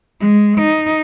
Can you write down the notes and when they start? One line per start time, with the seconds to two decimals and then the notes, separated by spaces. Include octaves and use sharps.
0.20 G#3
0.58 D#4